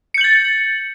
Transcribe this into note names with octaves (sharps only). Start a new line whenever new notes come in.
G6 A6 C#7 F#7